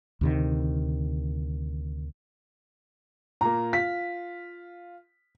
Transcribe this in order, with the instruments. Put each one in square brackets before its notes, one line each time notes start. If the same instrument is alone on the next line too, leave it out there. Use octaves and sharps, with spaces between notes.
[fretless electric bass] D2 C3 D#3
[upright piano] A#2 A#3 [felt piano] A#5
[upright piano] F4 [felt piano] B6